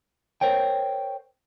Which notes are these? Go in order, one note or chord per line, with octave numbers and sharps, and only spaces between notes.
A#4 C5 C#5 G5